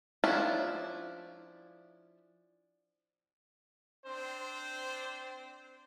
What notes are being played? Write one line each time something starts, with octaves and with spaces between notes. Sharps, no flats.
F3 C#4 D4 E4 F4
C4 D4 C5